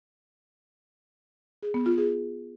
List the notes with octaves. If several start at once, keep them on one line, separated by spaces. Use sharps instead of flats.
G#4
B3
F4
G#4